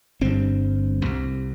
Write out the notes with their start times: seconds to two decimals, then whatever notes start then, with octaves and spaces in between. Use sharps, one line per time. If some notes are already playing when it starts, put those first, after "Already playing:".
0.21 G1 G2 C4
1.02 C2 C3